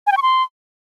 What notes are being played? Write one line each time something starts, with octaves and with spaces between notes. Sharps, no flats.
G#5
G5
C#6
C6